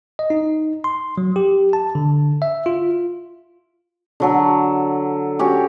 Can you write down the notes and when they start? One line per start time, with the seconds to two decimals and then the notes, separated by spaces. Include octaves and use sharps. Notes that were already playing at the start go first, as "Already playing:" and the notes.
0.19 D#5
0.30 D#4
0.84 C6
1.18 F#3
1.36 G4
1.73 A5
1.95 D3
2.42 E5
2.66 F4
4.20 D3 F#3 A4
5.39 C#4 F#4 G4